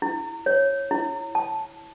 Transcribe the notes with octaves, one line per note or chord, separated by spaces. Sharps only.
E4
C#5
E4
A5